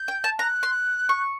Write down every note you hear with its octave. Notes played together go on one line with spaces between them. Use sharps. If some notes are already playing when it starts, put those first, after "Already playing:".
Already playing: G6
G5
A5
A#5 F#6
C6
C#6